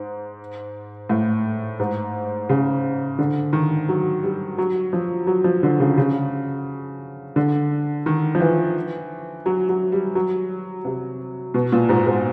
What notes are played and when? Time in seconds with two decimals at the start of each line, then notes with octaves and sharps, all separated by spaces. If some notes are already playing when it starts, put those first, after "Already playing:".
Already playing: G#2
1.09 A2
1.80 G#2
2.49 C#3
3.19 D3
3.53 D#3
3.89 F#3
4.23 G3
4.58 F#3
4.93 F3
5.27 F#3
5.44 F3
5.63 D3
5.80 C#3
5.98 C#3
7.36 D3
8.06 D#3
8.35 F3
8.40 E3
9.46 F#3
9.69 F#3
9.92 G3
10.15 F#3
10.85 C3
11.54 B2
11.72 A#2
11.89 G#2
12.07 G#2